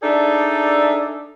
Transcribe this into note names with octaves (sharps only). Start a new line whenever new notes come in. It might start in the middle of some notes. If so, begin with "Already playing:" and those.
D4 D#4 G#4 A4 D5 E5